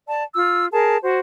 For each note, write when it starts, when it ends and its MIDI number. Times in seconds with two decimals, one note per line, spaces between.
0.07 0.24 74
0.07 0.24 81
0.34 0.67 65
0.34 0.67 88
0.72 0.96 68
0.72 0.96 70
0.72 0.96 81
1.02 1.19 66
1.02 1.19 72